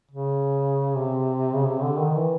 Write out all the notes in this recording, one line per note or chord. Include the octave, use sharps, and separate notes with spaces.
C#3
C3
C#3
C3
D3
D#3
E3